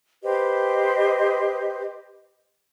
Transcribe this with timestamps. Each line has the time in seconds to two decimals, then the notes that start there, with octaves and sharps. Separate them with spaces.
0.23 G4 B4 C5 D#5